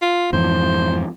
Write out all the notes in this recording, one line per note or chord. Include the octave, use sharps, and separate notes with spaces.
F4
F2 G#2 E3 C5